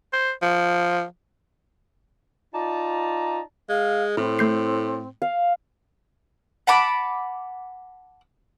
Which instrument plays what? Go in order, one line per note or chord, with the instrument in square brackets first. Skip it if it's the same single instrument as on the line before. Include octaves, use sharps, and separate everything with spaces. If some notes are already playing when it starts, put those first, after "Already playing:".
[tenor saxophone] C5
F3
[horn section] D#4 F4 D5 A5 A#5
[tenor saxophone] G#3 [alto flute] F5
[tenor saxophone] A2 [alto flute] C4 [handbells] E4
[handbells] A3 G6 C7
[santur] F5
[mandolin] F#5 A5 B5 D6